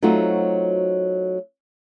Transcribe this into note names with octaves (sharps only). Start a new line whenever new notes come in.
F#3 A3 C4 D#4 F4 F#4